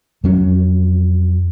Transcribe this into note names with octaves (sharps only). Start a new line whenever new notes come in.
F2 F#3 C#4